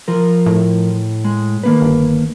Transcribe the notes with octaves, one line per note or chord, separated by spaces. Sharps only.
F3 A#4
A2
G#3
D#3 A#3 B4
G1